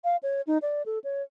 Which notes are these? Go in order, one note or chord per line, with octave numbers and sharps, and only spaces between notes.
F5
C#5
D#4
D5
A4
C#5